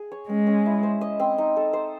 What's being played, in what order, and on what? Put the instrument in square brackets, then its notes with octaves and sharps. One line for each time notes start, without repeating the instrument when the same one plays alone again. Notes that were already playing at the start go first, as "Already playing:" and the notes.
Already playing: [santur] G#4
C#5
[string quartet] G#3 [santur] C#4
[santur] C#4
E4
C5
D#5
C4
D#4
A4
C5